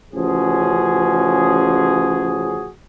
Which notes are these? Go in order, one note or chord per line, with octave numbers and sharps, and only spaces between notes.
A1 C#3 F3 F#4 G#4